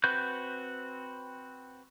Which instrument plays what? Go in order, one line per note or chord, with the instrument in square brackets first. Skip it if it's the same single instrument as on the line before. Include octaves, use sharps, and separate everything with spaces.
[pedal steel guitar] C4 F#4 B4 G6